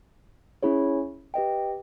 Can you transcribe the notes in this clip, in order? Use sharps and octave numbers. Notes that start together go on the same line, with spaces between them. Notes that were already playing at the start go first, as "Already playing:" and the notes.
C#4 E4 G#4 C#5
G4 B4 D#5 G5